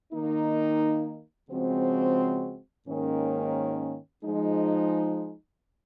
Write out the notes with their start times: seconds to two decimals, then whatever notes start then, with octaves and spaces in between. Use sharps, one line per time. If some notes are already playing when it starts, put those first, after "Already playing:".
0.11 D#3 A#3 D#4
1.48 C#3 F3 G#3 C4 F#4
2.86 G#2 D#3 A#3 C#4
4.24 F3 G#3 D#4